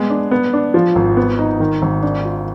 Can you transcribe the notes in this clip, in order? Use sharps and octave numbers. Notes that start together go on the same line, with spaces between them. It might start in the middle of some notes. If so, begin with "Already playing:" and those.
Already playing: G#3 B3
D4
B3
D4
F3
G#1
B3
D#4
D#3
G#1
D4
F4